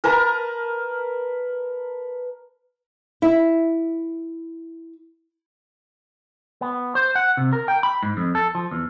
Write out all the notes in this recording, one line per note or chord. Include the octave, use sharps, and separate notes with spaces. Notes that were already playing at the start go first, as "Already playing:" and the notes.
A#4 B4 A5 A#5
E4 E5
B3
C5
F#5
C3
A#4
G5
B5
G#2
F2
A4
F3
E2